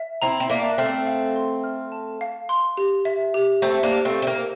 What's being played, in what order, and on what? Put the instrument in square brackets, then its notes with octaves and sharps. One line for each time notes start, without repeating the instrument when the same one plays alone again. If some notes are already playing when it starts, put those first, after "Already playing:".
Already playing: [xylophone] E5
[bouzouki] C4 E4 [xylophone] A#5
[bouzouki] C4
[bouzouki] A#3 D4 [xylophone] E5
[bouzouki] A3 C4 [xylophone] F6
[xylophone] F5
C6
F6
A5
F5
C6
G4
E5
G4
[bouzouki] A3 C4 [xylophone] C5
[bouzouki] A#3 D4
[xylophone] G4
[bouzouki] A3 C4
[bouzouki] C4 [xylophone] E5
[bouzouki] A#3